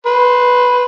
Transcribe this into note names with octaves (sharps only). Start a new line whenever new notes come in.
B4 C6